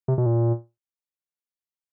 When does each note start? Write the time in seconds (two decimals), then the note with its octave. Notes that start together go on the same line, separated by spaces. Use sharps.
0.08 C3
0.18 B2
0.26 A#2